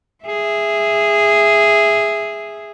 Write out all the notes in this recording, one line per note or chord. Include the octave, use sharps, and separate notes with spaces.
G#4 E5